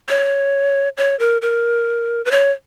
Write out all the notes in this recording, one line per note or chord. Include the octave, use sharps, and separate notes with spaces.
C#5
C#5
A#4
A#4
B4
C#5